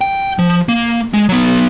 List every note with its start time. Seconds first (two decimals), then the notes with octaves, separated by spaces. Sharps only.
0.01 G5
0.39 F3
0.69 A#3
1.14 G#3
1.29 F#3 B3